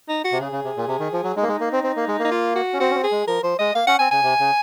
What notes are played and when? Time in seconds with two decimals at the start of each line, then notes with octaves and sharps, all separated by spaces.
0.09 D#4
0.24 F#4
0.32 C3
0.40 C#3 G#4
0.52 C#3
0.64 C3
0.77 A#2
0.88 C3
1.00 D#3
1.13 F3
1.24 F#3
1.36 G#3 D#4
1.43 A#3
1.48 G#3
1.60 A#3
1.72 C4
1.84 C4
1.96 A#3
2.08 G#3
2.19 A#3
2.25 D#4
2.31 F4
2.56 F#4
2.74 C#4
2.80 C4 F#4
2.91 C#4
2.95 C4
3.04 G#4
3.12 G#3
3.28 F3 A#4
3.43 F3 C5
3.59 G#3 D#5
3.75 A#3 F5
3.87 C#4 F#5
3.99 C4 G#5
4.11 C#3 G#5
4.23 C3
4.40 C#3